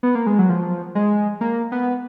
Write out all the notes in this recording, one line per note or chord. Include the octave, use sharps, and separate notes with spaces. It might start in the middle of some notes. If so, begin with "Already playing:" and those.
B3
A#3
G#3
F#3
F3
G#3
A#3
B3